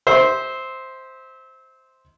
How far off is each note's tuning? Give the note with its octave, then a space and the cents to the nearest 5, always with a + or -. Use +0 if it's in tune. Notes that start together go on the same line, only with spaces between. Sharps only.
C5 +0 E5 -25